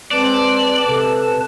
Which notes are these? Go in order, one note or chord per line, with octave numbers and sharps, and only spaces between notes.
G#3 C4 B4 D5 A5
C3 A4